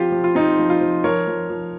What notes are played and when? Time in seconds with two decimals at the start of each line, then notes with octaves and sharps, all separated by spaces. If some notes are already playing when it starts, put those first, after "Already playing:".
Already playing: F3 C4 F4 G4
0.12 F3
0.24 F4
0.35 C4 D#4
0.59 F3
0.70 F4
0.81 F3
1.04 F3 A#4 C#5
1.27 F3
1.50 F3